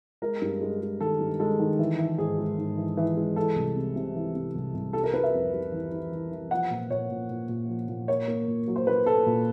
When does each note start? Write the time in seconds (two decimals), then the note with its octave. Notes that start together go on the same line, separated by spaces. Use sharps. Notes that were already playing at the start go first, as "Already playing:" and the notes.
0.22 G#3 A#4
0.42 G2
0.61 G#3
0.81 G#3
1.01 D#3 A4
1.20 G2
1.40 G#3 A4
1.60 D#3
1.79 E3
1.99 E3
2.18 G#2 G#4
2.38 G#3
2.58 G#2
2.78 E3
2.97 E3
3.17 G#3
3.36 E3 A4
3.56 C2
3.76 C3
3.96 C3
4.15 E3
4.35 C3
4.55 C2
4.74 C2
4.93 G3 A4
5.04 A#4
5.14 G3 B4
5.23 E5
5.34 F2
5.53 G3
5.72 E3
5.92 E3
6.12 E3
6.32 E3
6.51 F3 F#5
6.71 A#2
6.90 A#2 C#5
7.10 A#2
7.30 A#2
7.49 A#2
7.68 F3
7.89 A#2
8.08 A#3 C#5
8.28 A#3
8.48 A#2
8.68 F#3
8.76 C5
8.87 A#3 B4
9.06 A#3 A4
9.26 A#2